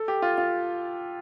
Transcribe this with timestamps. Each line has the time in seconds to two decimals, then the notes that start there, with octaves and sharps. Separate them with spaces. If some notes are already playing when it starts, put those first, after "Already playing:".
Already playing: A4
0.08 G4
0.22 F4
0.38 F4